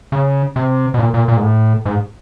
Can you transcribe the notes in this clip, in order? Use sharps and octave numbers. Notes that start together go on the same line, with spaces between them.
C#3
C3
B2
A#2
A#2
A#2
G#2
A2
G#2